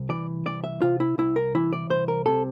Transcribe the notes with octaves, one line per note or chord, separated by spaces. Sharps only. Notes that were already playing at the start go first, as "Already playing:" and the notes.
Already playing: C2
E3 D5
C2 D5
E5
C3 F4
E4
C2 E4
A#4
E3 E4
D5
C2 C5
A#4
C3 A4